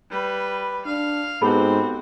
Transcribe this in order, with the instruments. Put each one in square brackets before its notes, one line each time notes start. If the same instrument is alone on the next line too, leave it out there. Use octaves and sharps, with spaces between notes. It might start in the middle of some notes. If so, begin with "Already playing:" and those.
[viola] G3 B4
[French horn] D4 [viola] F5
[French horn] G#2 [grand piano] B3 G4 A4 [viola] C4 F#4 [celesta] B5